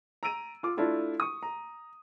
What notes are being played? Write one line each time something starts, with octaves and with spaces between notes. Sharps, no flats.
A#5 E6 D7 D#7
F4 D6
A3 D4 E4 F4 A4
C#6 D#6
A#5